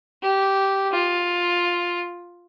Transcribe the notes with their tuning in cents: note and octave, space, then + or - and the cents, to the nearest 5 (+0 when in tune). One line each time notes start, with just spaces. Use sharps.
G4 -10
F4 +10